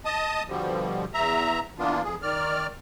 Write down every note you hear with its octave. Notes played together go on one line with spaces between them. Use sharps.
D#5 A5 D#6
B2 D3 F3 G3
E2 E5 A#5
E3 A#3 B3 D4 F4
F2 G#4
D#3 D5 F6